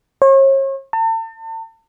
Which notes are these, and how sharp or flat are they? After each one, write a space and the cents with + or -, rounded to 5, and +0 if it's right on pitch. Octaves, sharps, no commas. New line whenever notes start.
C#5 -40
A5 +40